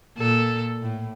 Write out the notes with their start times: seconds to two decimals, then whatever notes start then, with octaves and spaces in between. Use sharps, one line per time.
0.17 A#2 A4
0.82 A2